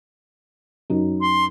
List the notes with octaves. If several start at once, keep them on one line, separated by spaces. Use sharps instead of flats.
F#2 F#3 D#4
C6